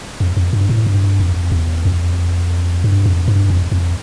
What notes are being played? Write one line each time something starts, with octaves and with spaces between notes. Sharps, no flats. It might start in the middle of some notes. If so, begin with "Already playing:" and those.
F2
F2
G2
A2
G2
F2
E2
F2
G2
F2
G2
F2
F2